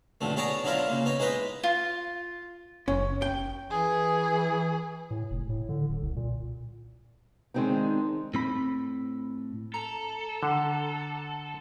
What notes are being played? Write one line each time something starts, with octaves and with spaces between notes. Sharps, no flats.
B1 F2 D3 A3
B3 G#4 C#5 D5 A5 A#5
D3 F#3 D4 E4 F4 A#4
C#3 A#3
B3 D#4 C#5
G#3 D#4 E4 B4 D#5
F4
F#1 C#4
G5
E3 G#4
A2
F1
A2
D3
D1
C2
A#2
D#3 G#3 C4 D4 D#4
A2 C4 B5
A4 A#5
D3 F#5